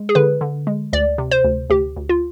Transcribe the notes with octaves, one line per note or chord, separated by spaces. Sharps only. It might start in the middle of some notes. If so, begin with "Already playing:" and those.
Already playing: G#3
G#4
D3 B4
D3
G#3
D2 D5
C3
C5
D2
D2 G4
D2
F4